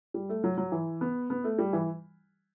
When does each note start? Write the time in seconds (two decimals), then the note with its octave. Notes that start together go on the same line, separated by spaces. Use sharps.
0.14 G3
0.29 A3
0.44 F#3
0.57 F#3
0.72 E3
1.01 B3
1.30 B3
1.44 A3
1.59 G3
1.73 E3